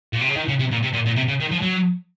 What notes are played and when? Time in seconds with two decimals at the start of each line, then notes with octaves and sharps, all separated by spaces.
0.13 A#2
0.21 C3
0.29 C#3
0.36 D#3
0.48 C#3
0.59 C3
0.72 A#2
0.83 C3
0.94 A#2
1.06 A#2
1.16 C3
1.28 C#3
1.40 D#3
1.51 F3
1.62 F#3